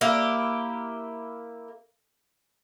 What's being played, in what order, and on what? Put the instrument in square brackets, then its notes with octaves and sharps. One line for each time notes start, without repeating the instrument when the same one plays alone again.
[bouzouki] A#3 E4 G4